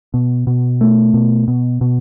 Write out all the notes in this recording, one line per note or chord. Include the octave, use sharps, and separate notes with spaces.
B2
B2
A3
B2
B2
B2